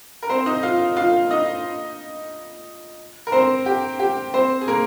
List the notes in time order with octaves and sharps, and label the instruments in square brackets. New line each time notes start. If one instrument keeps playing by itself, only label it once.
[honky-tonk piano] A#4
C4 C5
D#4 D#5
F4 F5
F4 F5
D#4 D#5
A#4
C4 C5
G4
G4
C4 C5
G#4
A#3 A#4